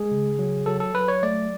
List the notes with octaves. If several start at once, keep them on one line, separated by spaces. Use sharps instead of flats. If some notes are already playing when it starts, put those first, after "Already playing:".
Already playing: G#3 G#4
C#3
F#3
F#3 A4
A4
F#3 B4
C#5
A3 D5